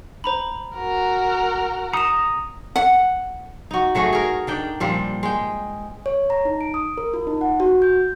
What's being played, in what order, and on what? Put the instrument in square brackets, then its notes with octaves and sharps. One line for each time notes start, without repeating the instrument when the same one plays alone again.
[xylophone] C5 A#5 B5
[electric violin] F#4 A#4
[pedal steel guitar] A#5 D#6 [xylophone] C#7 E7
[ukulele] F#5
[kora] D#4 F#4
F#3 A3 F#4 G#4
G#4 A#4
D#3 D4 G5
A#2 F3 G3
G#3 G5
[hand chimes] C#5
A#5
D#4
D7
D#6
A#4
F4
D#4
F#5
F#4
G6